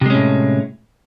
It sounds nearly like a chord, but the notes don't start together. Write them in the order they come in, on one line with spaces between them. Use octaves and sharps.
C3 G#3 C#4 A2